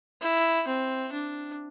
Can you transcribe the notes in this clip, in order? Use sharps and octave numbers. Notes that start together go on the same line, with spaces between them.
E4
C4
D4